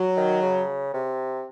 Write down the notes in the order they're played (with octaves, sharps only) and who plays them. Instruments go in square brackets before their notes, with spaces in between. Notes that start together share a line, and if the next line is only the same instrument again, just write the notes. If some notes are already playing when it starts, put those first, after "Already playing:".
Already playing: [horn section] F#3
[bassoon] D#3
C#3
C3